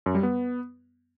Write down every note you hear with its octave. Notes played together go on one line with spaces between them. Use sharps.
F#2
G3
B3